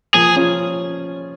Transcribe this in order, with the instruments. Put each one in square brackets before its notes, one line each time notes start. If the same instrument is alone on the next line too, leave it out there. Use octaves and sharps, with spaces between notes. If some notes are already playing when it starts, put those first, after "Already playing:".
[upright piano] F3 A#3 [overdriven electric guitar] G#4
[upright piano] C#4 F4